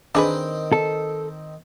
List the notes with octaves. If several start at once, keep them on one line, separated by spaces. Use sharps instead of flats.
D#3 C4 D4 G#4 B4
A4